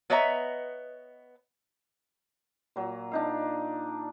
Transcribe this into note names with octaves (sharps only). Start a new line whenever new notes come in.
B3 B4 C#5 D#5 E5 A#5
A#2 F#3
D4 D#4 F5